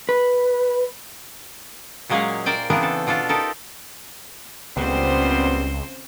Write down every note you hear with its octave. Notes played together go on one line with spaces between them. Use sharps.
B4
A#2 F#3 G#3 A#3 C#4 G#4
A#4 C5 D5 G5 G#5
C#3 E3 B3 C4 D4 A#4
A4
B2 D4 F4 A4
D#4 G4 A4 A#4
C#2 A#2 C#3 G3 B3 C4 C5